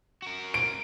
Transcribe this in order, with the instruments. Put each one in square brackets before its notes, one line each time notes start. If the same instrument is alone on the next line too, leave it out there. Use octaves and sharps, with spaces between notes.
[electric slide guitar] F#4 A#4
[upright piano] D7